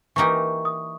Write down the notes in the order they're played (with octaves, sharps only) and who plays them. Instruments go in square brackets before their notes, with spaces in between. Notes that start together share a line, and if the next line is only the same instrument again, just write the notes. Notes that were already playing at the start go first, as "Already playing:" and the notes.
[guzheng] E3 A#3 D#4 G4 [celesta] C#6
[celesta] D#6